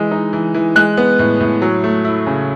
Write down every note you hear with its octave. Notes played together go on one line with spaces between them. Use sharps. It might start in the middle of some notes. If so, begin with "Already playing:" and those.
Already playing: E3 G#3
D#4
E3
E3
G#3 F#6
B3
A2
A2
F#3
A3
E4
C#3